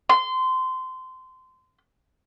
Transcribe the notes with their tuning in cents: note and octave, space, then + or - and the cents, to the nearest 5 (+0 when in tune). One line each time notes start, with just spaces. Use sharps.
C6 -20